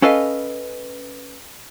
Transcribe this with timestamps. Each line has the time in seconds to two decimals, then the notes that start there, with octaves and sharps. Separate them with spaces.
0.02 C#4 A4 B4 D#5 F5